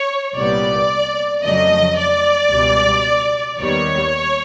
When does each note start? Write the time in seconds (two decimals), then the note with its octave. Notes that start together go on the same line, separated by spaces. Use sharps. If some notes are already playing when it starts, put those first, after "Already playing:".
Already playing: C#5
0.35 C2 A#2 G3 B3 D5
1.43 F2 C#3 F#3 A3 D#5
1.98 D5
2.51 C#2 B2 G3
3.60 D#2 D#3 G3 B3 C#5